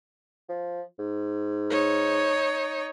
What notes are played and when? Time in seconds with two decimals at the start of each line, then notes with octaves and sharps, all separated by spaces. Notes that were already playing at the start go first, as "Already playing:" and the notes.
0.49 F3
0.99 G#2
1.70 D#4 C#5